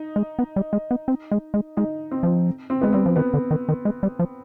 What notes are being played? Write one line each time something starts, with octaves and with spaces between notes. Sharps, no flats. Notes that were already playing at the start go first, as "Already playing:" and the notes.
Already playing: D#4
G#3
B3
G3
G#3
B3
C4
G#3
G#3
G#3 D#4
C4
F3
C4
G#3 B3
G3 C4
F3
D#3 B3
D3
D#3
D#3
G#3
G3
F3